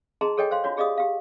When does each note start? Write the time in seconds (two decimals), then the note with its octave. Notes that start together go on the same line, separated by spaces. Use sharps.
0.21 D#4 G#4 D#5 A5 A#5 C6
0.37 G#4 A4 C#5 D#5 G5 G#5
0.51 C5 F5 C6
0.64 D4 F4 F#4 C#5
0.77 G4 G#4 D5 D#5 F5 D#6
0.98 G4 F5